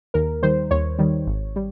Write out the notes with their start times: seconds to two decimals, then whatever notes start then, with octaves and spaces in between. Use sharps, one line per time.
0.14 D#2 A#4
0.42 D#3 G3 C5
0.71 D#2 C#5
0.99 D#3 G3
1.27 G#1
1.56 G3